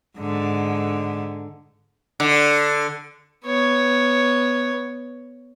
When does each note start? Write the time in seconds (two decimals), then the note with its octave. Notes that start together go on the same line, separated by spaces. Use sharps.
0.18 G#2 D3
2.20 D3
3.45 B3 C#5